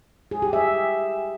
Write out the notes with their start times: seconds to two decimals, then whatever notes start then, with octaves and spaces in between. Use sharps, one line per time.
0.31 G#4
0.42 G4
0.53 E5